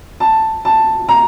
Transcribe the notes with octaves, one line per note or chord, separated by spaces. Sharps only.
A5
A5
A#5